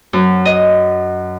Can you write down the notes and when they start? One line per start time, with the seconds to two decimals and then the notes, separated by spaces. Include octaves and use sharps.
0.13 F#2
0.45 D#5